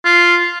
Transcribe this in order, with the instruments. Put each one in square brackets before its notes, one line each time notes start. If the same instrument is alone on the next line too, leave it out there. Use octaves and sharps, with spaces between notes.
[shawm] F4